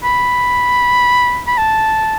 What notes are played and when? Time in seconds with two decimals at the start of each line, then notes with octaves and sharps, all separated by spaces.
0.04 B5
1.48 B5
1.58 A5